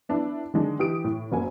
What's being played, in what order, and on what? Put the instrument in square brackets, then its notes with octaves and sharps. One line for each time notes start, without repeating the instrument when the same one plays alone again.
[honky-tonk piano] B3 D4 E4
D3 D#3 G#3 D4
E3 G4 D#6 D7
A2
F#1 F#3 A#3 G#5